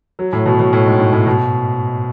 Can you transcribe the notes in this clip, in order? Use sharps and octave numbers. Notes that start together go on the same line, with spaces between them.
F#3
A2
B2
B2
A2
G#2
G#2
A2
B2